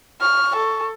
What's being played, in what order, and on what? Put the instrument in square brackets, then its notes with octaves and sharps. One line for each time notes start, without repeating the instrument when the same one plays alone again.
[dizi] C#6 [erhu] F6
[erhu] A4